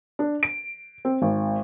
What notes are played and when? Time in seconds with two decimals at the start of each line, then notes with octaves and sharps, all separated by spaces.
0.19 D4
0.43 D7
1.05 C4
1.22 G#1